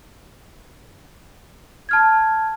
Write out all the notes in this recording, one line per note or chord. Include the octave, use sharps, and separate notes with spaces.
A5 F6 G#6